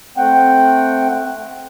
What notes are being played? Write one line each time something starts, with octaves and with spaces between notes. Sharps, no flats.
A3 C4 F#5 G5